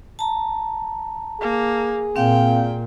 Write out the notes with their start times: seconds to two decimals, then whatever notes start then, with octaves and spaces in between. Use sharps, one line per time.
0.19 A5 A#5
1.41 A#3 G#4
2.16 A#2 C4 F5 G5